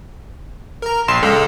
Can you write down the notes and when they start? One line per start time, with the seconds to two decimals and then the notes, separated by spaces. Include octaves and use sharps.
0.82 A#4 A#5
1.08 A#1 C6 C7 E7
1.23 C#2 G#3 A4